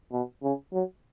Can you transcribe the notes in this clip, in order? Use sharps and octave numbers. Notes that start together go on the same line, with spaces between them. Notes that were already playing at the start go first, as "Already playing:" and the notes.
B2
C#3
F#3